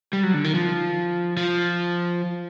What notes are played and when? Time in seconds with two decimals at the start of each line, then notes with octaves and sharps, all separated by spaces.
0.13 G3
0.23 F#3
0.34 D3
0.44 D#3
0.54 F3
1.37 F3